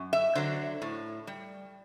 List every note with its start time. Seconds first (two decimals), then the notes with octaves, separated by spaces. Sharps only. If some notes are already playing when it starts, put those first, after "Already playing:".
Already playing: F#2
0.13 E5
0.35 D3 F#3 C5
0.82 A2
1.27 G3